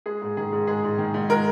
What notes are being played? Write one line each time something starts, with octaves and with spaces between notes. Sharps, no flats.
G#3 G#4
G#2
D#3 G#4
G#2
G#3 G#4
G#2
D#3
G#2
G#3 A#4